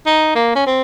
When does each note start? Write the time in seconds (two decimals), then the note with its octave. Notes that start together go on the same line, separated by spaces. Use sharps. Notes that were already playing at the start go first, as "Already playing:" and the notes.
0.06 D#4
0.35 A#3
0.55 C#4
0.66 C4